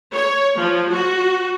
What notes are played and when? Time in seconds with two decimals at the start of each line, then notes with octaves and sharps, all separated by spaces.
0.14 C#5
0.59 F3
0.92 F#4